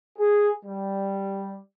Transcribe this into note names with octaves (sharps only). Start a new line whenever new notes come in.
G#4
G3